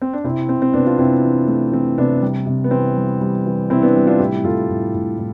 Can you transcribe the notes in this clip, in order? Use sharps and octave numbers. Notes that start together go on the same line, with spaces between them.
C4
D4
C3 C4 E4
C3 C4
C4
C3 B3 D4
D4 F4
C3 C4 E4
E3
A3
E3 C4
C3 B3 D4
G3
C3
B3
E3 C4
G3
G3
E3
C3 C4 E4
B3 D4
G3
D4 F4
A2 E4 G4
A2 F4 A4
A2
A2
A2